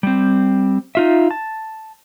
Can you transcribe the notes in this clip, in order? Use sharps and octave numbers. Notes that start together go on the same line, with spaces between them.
G3 C4
D#4 F4 E5
A5